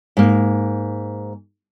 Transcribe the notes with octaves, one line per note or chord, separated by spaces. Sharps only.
G#2 A#3